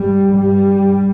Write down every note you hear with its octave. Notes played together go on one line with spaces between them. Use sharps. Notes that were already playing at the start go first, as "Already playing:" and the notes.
Already playing: G2 G3
G2 G3